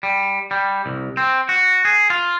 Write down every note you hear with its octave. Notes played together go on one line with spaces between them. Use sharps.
G3
G3
C2
C4
F#4
G#4
F4